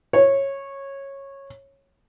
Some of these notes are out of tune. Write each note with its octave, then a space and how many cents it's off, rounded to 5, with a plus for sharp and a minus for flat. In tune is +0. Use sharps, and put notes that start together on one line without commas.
C#5 -15